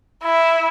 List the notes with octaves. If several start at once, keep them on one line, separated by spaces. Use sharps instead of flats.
E4